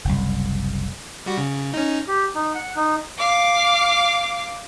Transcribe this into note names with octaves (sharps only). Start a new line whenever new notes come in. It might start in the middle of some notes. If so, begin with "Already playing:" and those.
F#1 C2
G3 F#4
C#3
C#4 D#4
G4
D#4
F#5
D#4
F5 D6